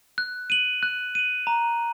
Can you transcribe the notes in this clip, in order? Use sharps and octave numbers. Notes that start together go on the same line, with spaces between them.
F#6
D#7 F#7
F#6
D#7 F#7
A#5